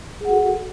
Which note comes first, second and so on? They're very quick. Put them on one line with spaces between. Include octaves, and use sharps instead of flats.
G#4 F#5 F#4 A4